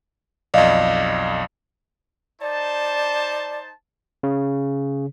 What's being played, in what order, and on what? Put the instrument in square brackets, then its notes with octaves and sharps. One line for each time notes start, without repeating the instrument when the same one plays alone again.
[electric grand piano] B1 F2 [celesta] D5 D#5 F5
[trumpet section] D#4 C5 A5 [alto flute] D5
[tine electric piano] C#3